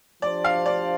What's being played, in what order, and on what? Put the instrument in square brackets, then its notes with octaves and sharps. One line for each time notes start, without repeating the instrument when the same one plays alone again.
[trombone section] F3 D4 G4 C5 [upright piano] D5
[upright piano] F5
D5